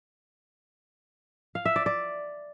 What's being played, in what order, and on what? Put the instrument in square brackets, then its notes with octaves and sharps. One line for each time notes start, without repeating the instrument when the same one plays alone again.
[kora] F5
E5
D5
D5